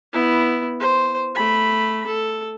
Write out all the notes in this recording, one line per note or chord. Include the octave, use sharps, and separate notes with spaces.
B3 E4
C5
A3 B5
A4